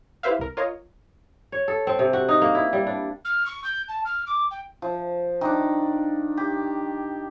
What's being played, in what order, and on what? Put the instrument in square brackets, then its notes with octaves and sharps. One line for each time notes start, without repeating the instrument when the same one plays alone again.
[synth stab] E4 G4 B4 C5 E5 F5
C2 A#4
F4 A#4 C#5 D#5
[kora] C#5
A4
C4
C3
F#4
D#4
A#3
E4
G3
D4
[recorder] F6
C#6
G6
A5
F6
D6
G5
[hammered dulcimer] F3
D#3 D4
G4